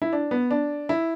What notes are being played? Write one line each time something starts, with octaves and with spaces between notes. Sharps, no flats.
E4
D4
B3
D4
E4